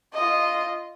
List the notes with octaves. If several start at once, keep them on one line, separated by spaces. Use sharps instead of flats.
F4 D#5